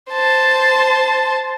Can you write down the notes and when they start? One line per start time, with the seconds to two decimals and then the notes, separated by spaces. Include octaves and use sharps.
0.11 C5 A5